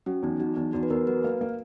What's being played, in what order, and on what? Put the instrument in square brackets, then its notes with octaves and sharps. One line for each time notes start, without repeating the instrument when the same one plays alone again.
[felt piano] F#3 [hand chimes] C#4
[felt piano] E2 [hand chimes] D#4
[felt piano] F#3 [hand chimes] D#4
[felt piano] E2 [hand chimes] D#4
[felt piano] E2 [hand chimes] F#4
[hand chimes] B4
[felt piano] E2 [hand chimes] A#4
[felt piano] F#3 [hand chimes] B4
[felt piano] A#3
A#3